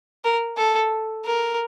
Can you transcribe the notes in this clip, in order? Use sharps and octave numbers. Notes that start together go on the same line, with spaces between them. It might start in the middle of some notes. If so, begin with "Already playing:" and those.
A#4
A4
A#4